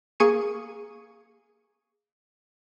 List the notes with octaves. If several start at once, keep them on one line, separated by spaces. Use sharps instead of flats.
A#3 G#4 C#6 G#6 D#7